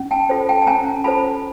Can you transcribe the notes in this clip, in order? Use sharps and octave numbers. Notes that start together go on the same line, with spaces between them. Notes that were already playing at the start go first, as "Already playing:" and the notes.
Already playing: C#4
G5 A5
F4 A4 C5
G5 A5
A5
C#4 G#5 A#5
F4 A4 C5 A5 B5